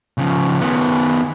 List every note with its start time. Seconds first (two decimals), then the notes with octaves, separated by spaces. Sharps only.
0.18 C#3 F3
0.61 D#3 B3